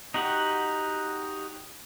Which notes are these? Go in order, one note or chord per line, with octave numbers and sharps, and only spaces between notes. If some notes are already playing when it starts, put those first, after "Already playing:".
D#4 F#4 G4 F#5